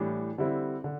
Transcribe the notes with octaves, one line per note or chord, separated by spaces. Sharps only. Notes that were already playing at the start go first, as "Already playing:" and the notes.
Already playing: A2 E3 G3 D4
D3 G3 C4 E4
D3